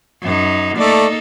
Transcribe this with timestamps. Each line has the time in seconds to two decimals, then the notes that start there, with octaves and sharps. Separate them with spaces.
0.23 F#2 D#4
0.78 A3 A#3 D#4 A4 D5